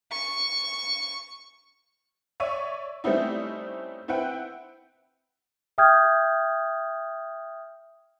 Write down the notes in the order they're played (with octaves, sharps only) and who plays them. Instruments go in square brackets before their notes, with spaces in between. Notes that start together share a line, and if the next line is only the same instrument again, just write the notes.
[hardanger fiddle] C#6
[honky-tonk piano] C#5 D5 E5 C#6 D#7
G3 A3 C4 C#4 D#4 E4
C4 E4 B4 F#5 G5
[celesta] E5 G5 D#6 F6 G6 G#6